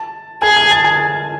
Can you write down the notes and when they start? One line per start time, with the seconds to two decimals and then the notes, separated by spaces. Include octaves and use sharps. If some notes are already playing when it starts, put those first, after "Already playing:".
Already playing: A5
0.42 G#4 G#5 G#6
0.56 G#5 G#6
0.71 A5 A6
0.84 G#5 G#6